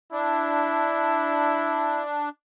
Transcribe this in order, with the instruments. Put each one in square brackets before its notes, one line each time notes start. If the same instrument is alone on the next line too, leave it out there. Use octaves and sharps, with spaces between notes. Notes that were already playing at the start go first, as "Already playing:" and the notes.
[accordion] D4 [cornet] E4